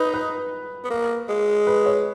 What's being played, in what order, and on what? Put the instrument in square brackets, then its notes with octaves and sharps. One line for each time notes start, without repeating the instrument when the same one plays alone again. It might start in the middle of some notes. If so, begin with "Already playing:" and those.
Already playing: [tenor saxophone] D#4 [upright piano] B4
[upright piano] B4
[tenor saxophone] B3
A#3
G#3
[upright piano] B4
C#5